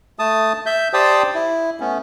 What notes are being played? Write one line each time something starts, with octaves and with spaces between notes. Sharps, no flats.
A3 A5 D#6
E5 G6
G4 C5 D5 G5 A5 D#6
E4
A3 B3 C#4